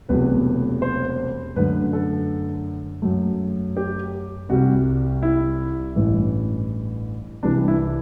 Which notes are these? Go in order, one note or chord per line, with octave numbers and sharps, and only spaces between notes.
E1 E2 C3 F#3 A3 B4
C5
F#2 D3 A3 B4
A4
F#2 F#3 A3
G4
C2 C3 G3 F#4
E4
A1 G2 E3 A3
C2 C3 E3 G3 D4
E4